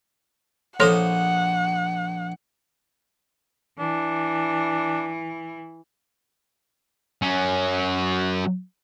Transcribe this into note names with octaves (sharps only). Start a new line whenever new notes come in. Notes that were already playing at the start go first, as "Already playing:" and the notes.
A#1 A4 C5 C#5 F#5 C6 D#6
E3 D4
F#3 C#4